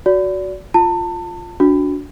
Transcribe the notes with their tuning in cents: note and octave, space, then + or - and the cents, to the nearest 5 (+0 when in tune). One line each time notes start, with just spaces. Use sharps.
F#4 +0 D5 -30
F4 -5 A5 +30
D4 -20 F#4 -15